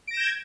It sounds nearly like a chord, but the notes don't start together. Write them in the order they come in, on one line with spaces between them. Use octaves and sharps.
D7 A#6 E7 G6 G#6